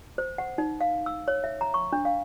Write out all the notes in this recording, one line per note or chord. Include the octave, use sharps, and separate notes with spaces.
C5
F#5
D#4
F5
E6
C#5
E5
A#5
C#6
D4
F5